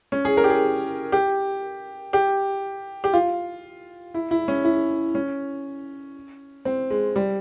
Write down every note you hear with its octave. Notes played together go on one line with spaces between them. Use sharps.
C#4
G#4
A#4
G4
G#4
G4
G4
G4
F4
E4
E4
C#4
E4
C#4
C4
G#3
G3